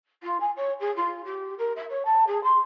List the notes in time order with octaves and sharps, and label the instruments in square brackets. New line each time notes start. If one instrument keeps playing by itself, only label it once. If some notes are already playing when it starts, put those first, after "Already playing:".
[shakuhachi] F4
G#5
C#5
G#4
F4
G4
A#4
E5
C#5
A5
G#4
C6